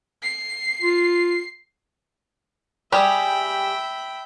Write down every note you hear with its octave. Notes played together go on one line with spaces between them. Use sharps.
C7
F4
G3 G4 G#4 E5 G5 B5